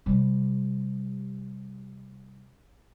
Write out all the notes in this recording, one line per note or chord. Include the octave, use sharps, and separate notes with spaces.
C3 G3